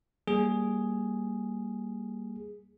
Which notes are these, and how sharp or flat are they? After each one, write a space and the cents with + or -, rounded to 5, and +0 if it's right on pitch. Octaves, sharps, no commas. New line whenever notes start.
G3 +0 A#3 +0 G#4 +0